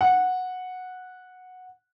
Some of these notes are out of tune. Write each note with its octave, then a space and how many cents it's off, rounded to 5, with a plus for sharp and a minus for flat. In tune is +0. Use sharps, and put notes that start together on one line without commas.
F#5 -10